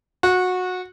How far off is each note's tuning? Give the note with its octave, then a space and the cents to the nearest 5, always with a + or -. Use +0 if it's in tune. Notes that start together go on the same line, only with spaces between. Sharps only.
F#4 -20